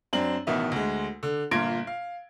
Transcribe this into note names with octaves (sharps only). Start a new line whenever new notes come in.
F#2 C4 D4 F#7
A1 B2 D#3 B3 E5
D2 G#3
D3
G1 A#2 F4 C6 G#6 D7
F5